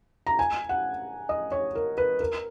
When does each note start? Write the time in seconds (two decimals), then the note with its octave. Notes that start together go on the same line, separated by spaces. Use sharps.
0.27 A#5
0.39 G#5
0.69 F#5
1.29 D#5
1.52 C#5
1.75 A#4
1.98 B4
2.20 A#4